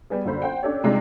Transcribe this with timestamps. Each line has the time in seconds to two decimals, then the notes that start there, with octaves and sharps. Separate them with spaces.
0.10 G3 B3 G#4
0.24 A#1 F#2 D3 C5 B5
0.42 C5 F#5 G5
0.63 C#4 D4 G4 A4 C#5
0.84 C3 G3 G#3 D4 D#4 F4